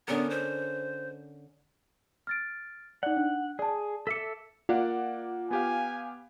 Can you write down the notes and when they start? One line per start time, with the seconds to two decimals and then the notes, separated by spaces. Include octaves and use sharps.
0.08 D3 B3 C#4 A#4
0.30 C5
2.27 F6 A6 D7
3.03 D#4 D5 F#5
3.17 D4
3.59 G#4 D5 A5
4.07 A4 E5 D6 B6 C#7
4.69 A#3 F4 D5 F#5
5.51 B3 G4 F5 G#5